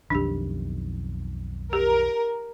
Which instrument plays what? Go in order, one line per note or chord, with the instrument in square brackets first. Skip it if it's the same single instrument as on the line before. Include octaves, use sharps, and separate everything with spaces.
[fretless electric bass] B1 F2 D#3 [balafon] D4 G4
[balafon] G4 [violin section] A#4